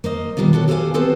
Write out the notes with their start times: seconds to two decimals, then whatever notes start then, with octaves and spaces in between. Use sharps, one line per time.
0.04 A#3 C5 D#5
0.37 B2 D#3 G3 D4 F4
0.53 D4 F#4 A4 C#5
0.68 G4 A4 C5 C#5 F5 G#5
0.94 B3 C4 A4 B4 C5